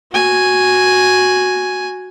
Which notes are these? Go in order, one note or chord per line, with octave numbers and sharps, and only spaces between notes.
F#4 G#5